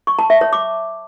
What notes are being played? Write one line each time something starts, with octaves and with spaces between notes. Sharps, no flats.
C#6
A5
E5
C#5
D6